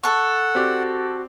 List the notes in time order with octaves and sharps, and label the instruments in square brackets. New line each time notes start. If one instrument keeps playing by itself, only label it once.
[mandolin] A4 C#6 [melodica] F#5
[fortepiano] C4 G4 D5 [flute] F#4